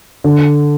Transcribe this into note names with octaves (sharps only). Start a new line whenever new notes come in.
D3